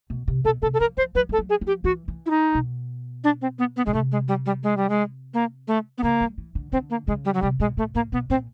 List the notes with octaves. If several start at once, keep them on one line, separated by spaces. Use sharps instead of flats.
B2
C3
B2 A4
C3 A4
A4
F3 A#4
F3 C5
F#3 B4
G3 A4
F#3
G#4
F3
G4
E3 F#4
E3
E4
D#4
B2
D4
C4
B3
B3
B2 G#3
C3 A3
G#3
G3
G3
G#3
G3
G#3
A#3
A3
B3
C#3 A#3
G3
E3
D3
D3 C4
A#3
C#3 G#3
G3
F#3
C3 G3
B2 G#3
A#2 A3
A2 A#3
B2 B3
A#2 C4